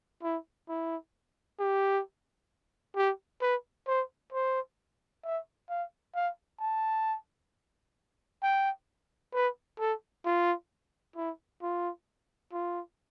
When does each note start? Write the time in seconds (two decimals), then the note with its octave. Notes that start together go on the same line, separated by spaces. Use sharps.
0.23 E4
0.69 E4
1.59 G4
2.96 G4
3.42 B4
3.87 C5
4.33 C5
5.24 E5
5.69 F5
6.15 F5
6.61 A5
8.43 G5
9.34 B4
9.80 A4
10.26 F4
11.16 E4
11.62 F4
12.53 F4